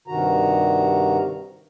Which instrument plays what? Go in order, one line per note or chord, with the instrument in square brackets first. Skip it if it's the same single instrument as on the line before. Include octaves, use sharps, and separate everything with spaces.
[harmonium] G2 C3 D#3 F#4 A#5